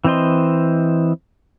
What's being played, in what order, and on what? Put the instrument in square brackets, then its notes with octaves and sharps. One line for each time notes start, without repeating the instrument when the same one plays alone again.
[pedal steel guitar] E3 C4 C5 D#5 C6